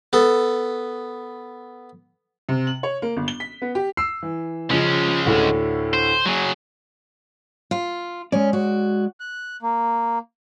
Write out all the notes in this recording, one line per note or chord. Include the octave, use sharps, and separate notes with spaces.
B3 A4
C3
F#7
C#5
A#3
G1
G7
B6
B3
G4
E6 C7
E3
C#3 F3 G#3 C#4
D2 A2 D3
C5
F#3 G#4
F4
G#3 C#4 D5
F#4
F#6
A#3